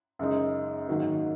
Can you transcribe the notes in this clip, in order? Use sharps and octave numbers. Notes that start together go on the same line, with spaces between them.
F#2 C#3 G#3 D#4
G#2 D#3 F#3 A#3